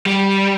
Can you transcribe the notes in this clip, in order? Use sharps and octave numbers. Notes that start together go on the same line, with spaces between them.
G3